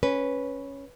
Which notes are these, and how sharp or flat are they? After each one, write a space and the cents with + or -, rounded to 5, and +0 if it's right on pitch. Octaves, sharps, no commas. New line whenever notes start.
C#4 +0 B4 -5